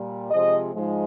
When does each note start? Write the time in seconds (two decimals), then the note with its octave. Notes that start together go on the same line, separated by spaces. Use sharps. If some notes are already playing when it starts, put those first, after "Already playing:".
Already playing: A#2 G3
0.31 C3 F3 G#3 D#5
0.75 G#2 F3 G#3